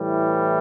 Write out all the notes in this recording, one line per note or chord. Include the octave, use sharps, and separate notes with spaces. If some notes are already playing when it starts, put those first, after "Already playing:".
Already playing: A2 E3 G3